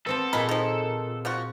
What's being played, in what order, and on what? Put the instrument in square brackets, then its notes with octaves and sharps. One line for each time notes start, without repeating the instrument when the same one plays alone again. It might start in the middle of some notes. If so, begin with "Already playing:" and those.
[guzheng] B3 C4 A5 [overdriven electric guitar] A4
[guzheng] A#2 G#4 [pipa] G#3 A#4 B5
[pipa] D#3 F3
F3 F4 F#4